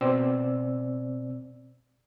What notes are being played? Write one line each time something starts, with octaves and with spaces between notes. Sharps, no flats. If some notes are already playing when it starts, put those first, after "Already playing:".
B2 C4 D5 E6